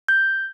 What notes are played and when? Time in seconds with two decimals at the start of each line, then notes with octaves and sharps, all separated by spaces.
0.08 G6